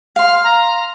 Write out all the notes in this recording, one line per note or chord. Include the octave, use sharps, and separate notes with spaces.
F5 C6 F6
A#5